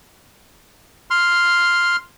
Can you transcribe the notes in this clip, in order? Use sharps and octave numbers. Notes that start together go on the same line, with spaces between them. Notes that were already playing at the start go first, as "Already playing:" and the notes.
C6 F6